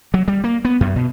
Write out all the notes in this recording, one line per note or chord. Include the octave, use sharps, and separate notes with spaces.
F#3
G3
A#3
B3
F#2
B2